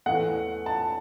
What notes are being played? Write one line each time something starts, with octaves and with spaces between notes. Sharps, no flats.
E2 E3 A3 F#5
A5